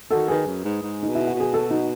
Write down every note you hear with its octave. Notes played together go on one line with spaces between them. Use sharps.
D#3 F#4 A4
D#3 G#4 B4
F#2
G#2
G#2
D#4
B2
E4
F#4
B2
G#4
F#4 A4
D#4 F#4